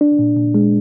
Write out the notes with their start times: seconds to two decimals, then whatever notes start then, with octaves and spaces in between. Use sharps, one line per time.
0.01 D4
0.19 A#2
0.36 A#2
0.55 G#3